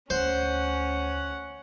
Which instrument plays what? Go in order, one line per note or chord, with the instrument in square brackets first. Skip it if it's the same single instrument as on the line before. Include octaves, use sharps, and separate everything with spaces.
[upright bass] D2 [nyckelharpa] C#4 F#5 [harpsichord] C5